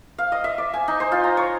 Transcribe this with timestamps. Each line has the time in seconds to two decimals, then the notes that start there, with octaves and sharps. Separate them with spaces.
0.18 F5
0.32 D#5
0.44 E5
0.58 D5
0.74 G#5
0.88 D#4
1.00 C5
1.12 F4
1.24 A#5
1.37 C#5